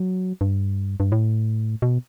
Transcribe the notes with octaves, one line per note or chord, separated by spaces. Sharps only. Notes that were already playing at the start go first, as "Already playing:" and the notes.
Already playing: F#3
G2
G2
A2
B2